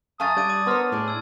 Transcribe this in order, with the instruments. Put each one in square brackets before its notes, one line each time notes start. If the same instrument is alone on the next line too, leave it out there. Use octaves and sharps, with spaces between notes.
[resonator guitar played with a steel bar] F#2 F5 G#5 [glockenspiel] A5 C#6 A6 [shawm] D#6
[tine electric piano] G3 [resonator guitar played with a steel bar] D4 [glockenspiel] G6 G#6 D#7
[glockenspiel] D6 D#7
[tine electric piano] B3 [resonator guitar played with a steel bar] A#4 C5 C#5 [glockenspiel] C6 D6 F6
[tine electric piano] A2 [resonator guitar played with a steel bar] D4 G#4
[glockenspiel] A5 E6 G#6